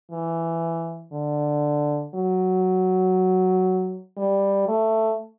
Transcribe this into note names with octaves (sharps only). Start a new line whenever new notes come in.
E3
D3
F#3
G3
A3